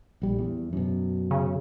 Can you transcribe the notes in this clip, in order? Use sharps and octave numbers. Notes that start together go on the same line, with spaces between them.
A#1 G3
E2
F#2 B2
C#3